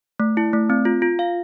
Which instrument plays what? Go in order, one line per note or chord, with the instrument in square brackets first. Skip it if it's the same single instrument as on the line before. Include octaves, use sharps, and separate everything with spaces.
[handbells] A3
E4
A3
C4
F4
F4
F5